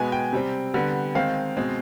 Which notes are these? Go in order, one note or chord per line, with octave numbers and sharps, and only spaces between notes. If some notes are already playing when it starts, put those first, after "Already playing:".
Already playing: B2 G#3 B3 G#5
G5
C3 G3 C4
D3 G3 B3
D#3 G#3 C4 F5
B2 G#3 C4